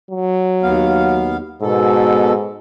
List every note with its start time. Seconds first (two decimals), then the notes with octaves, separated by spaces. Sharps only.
0.11 F#3
0.63 D#2 B3 F5
1.63 G#2 B2 A4